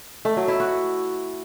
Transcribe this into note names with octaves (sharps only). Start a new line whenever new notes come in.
A3
F#3
E4
F#4